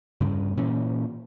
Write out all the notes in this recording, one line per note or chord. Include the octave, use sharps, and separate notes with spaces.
G2 C#3
A#2 E3 C#4